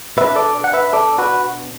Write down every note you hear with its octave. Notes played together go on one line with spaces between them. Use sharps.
B2 B3 D4 B4 E5
A4 D5
F#5
B4 E5
A4 D5
F#4 B4